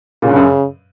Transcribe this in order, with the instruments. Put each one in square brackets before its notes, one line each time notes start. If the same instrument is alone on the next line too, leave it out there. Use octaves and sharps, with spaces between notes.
[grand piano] A#2 [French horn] C#3
[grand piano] G2
F#2